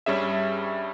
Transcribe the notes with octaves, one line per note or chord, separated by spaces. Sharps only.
G2 G3 C#4 G#4 E5